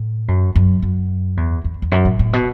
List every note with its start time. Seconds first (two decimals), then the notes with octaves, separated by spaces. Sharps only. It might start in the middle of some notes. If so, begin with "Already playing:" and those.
Already playing: A2
0.28 F#2
0.56 F#2
0.82 F#2
1.37 E2
1.64 E2
1.82 E2
1.92 F#2
2.05 A2
2.19 A2
2.33 B2